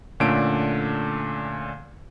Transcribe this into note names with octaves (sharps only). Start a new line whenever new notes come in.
A#2 D3 A3 C#4 D4 D7